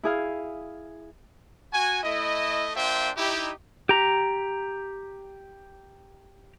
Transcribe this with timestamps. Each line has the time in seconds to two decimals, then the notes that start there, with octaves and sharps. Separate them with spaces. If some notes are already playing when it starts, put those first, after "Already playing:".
0.03 E4 G#4 F5
1.73 F#4 G#5
2.04 A3 E4 D#5
2.76 A#3 D4 F4 C5 E5 G5
3.17 D#4 E4 G4
3.89 G4 A#5